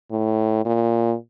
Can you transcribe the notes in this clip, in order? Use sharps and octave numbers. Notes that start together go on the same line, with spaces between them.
A2
A#2